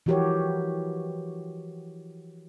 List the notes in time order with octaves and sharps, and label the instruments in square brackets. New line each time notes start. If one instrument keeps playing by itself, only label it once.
[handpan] E3 F3 F#4 G4 A#4 C#5